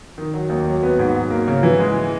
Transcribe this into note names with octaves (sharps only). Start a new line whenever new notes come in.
D#3
F#3
D#2
F#3
B3
G#2
F#3
A#3
C#3
E3
G#3